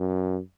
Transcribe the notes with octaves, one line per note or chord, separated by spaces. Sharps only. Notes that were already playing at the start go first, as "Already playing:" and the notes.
Already playing: F#2